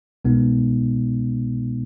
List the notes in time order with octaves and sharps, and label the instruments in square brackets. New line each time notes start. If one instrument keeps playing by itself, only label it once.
[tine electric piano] C2 B2 G#3 B3 D#4